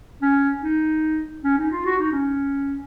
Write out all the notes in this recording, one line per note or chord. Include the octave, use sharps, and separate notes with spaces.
C#4
D#4
C#4
D#4
F4
F#4
D#4
C#4